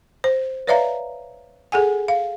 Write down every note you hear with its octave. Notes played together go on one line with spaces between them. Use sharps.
C5
B4 C#5 D5 E5 F5 A#5
G#4 A4 F#5 G#5
F5